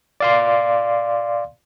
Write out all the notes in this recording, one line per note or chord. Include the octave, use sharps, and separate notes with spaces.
D5 F5 C6